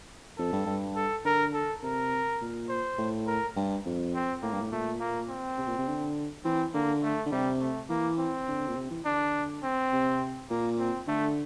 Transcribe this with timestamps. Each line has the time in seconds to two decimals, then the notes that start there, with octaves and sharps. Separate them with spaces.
0.38 F2 A4
0.53 G2
0.66 G2
0.96 A4
1.24 D3 A#4
1.54 A4
1.82 C3 A#4
2.41 A#2
2.69 C5
2.99 A2
3.27 A#4
3.56 G2
3.86 F2
4.14 C4
4.42 A2 A#3
4.52 G2
4.61 A2
4.72 A#2 A3
5.00 A#3
5.29 C4
5.58 C3
5.68 A#2
5.78 C3
5.88 D3
6.45 E3 C4
6.74 D3 A#3
7.03 A3
7.26 D3
7.32 C3 G3
7.60 A3
7.89 E3 A#3
8.19 C4
8.48 D3
8.68 A#2
8.76 C3
8.91 E3
9.05 D3 D4
9.63 C4
9.93 C3
10.50 A#2 A#3
10.79 C4
11.07 D3 A3